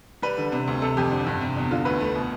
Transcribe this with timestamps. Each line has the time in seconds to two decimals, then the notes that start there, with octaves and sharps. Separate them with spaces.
0.22 G3 B4
0.37 D3
0.52 C3
0.67 D2
0.82 C3 A4
0.97 F2 G4
1.11 D3
1.26 G2
1.41 C3
1.56 E2
1.71 D3 F4
1.85 D2 B4
2.01 A3
2.15 B2